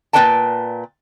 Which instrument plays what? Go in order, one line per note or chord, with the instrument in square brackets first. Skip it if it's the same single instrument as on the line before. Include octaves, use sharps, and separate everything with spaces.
[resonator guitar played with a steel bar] A#2 E4 B4 D5 G5 A5